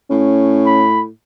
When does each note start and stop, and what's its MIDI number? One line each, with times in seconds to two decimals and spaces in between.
0.11 1.08 45
0.11 0.85 61
0.66 1.01 83